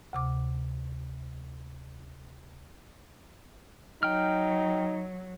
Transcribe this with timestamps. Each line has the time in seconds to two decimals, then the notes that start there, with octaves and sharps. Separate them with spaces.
0.13 D2 C3 D6
4.03 F#3 D#4 G5 F6